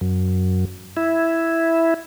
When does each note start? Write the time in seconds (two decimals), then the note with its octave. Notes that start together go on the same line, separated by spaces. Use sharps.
0.01 F#2
0.97 E4